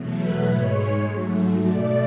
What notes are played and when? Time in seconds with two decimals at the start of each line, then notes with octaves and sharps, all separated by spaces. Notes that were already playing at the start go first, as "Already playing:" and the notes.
Already playing: E2 B2 F#3 A3
0.14 B4
0.43 G#2 G#3 C#5
1.02 G#2 F#3 A3
1.61 B2 A3 D5